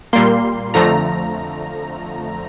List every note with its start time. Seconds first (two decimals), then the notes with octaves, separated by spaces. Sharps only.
0.13 A#2 G3 A#3 C6
0.74 F2 D3 F3 A3 A#5